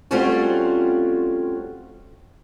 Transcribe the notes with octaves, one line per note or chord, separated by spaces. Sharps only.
G3 A3 C4 C#4 F4 F#4